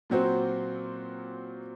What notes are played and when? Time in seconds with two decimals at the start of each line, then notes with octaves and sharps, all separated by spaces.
0.10 A#2 F#3 C4 F#4 C5